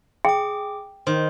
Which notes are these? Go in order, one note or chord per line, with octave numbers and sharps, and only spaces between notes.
G#4 G5 D6
D#3 C5 C6